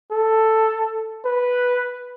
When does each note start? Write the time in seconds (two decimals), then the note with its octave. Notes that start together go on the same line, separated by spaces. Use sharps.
0.11 A4
1.25 B4